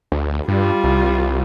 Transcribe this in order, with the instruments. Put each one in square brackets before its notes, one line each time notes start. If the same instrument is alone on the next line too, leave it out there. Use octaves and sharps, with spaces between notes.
[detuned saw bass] D2
[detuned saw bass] G2 [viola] G3 F4
[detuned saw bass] C2